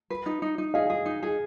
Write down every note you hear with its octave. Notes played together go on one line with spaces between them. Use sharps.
B4
D#4
D#4
D#4
G#4 D#5 F5
G#4
D#4
G#4